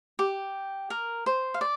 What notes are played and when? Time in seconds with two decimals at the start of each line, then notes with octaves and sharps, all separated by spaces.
0.19 G4
0.90 A#4
1.26 C5
1.54 F5
1.61 D5